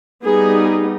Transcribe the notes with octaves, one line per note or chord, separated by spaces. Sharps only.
G3 B3 D#4 G#4